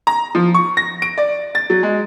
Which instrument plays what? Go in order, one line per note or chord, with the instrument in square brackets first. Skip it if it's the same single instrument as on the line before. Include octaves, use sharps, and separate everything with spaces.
[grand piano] A#5
F3
C#6
A#6
D7
D5
A6
F#3
G#3